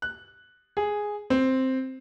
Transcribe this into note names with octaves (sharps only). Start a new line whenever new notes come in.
F#6
G#4
C4